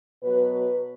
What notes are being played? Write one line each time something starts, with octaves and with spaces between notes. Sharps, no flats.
B2 F#3 B4
B4